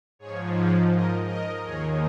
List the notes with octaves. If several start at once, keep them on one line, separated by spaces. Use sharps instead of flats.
G#2 F3 G#4 C#5
A#4 D#5
A#4 D#5
D#2 D#3 G#4 C#5